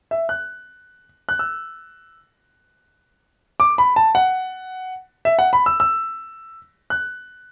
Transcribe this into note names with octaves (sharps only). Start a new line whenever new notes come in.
E5
F#6
F#6
E6
D6
B5
A5
F#5
E5
F#5
B5
E6
E6
F#6